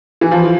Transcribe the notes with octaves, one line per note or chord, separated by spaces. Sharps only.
E3
F3